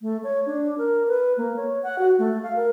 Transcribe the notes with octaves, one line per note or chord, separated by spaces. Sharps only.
A3
C#5
D4
A#4
B4
A#3
C#5
F#5
F#4
A3
F5
A#4